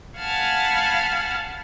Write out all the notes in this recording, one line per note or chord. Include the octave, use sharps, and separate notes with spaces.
F5 F#5 G#5 A5 B5 F6